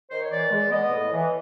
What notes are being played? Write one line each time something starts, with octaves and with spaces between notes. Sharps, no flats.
D#3 C5
C#5
E3 D5
G#3
B3 D#5
A2
E3